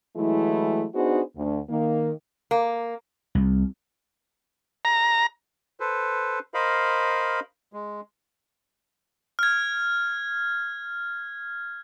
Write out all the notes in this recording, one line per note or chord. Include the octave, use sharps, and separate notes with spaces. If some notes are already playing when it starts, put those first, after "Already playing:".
E3 F#3 G#3 A3 E4
B3 D4 D#4 F#4 G#4 C5
D2
D#3 A#3
A#3
C2
A#5
A4 B4 C5
A#4 C5 D#5 F5 B5
G#3
F6 G#6